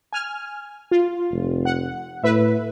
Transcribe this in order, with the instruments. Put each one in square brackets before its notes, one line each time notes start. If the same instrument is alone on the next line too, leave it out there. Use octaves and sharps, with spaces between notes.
[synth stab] G#5 F6
F4
[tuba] F1
[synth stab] F#5
[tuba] A2 [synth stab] B4 E5